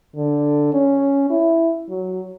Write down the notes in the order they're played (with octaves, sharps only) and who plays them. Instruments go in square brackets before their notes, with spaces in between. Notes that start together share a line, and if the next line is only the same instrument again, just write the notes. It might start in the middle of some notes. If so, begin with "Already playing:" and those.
[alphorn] D3
C#4
E4
F#3